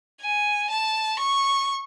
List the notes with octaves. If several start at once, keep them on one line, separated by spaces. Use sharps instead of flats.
G#5
A5
C#6